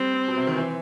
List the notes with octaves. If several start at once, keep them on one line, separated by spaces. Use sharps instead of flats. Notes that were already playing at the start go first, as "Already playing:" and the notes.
Already playing: G3 C4
B2
C3
D#3
E3